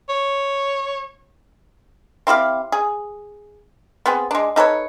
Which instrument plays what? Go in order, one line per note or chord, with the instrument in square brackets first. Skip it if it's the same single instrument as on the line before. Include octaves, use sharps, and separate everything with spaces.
[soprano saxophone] C#5
[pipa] C4 E4 G4 F5
G#4
B3 C4 G#4
G#3 D4
D#4 A4 B4 C#5